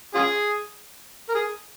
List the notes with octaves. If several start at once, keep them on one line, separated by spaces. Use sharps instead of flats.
C#4 F4 G#4
A#4
G#4